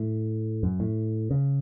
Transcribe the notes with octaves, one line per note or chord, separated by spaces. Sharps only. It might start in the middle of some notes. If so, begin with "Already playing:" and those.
Already playing: A2
F#2
A2
C#3